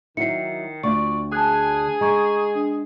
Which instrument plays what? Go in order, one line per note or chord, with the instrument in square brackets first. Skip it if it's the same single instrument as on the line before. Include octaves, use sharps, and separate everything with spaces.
[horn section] D#3 [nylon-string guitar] F#3 E4 [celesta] C7 C#7
[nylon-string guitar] D2 [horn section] F4 D5 [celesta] C#6
[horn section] G#4 G#5 [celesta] A5 F#6
[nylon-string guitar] G#3 [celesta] A#5 C#6 G#6
[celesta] D4